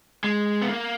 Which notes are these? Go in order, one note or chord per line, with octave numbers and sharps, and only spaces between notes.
G#3
B3
A#3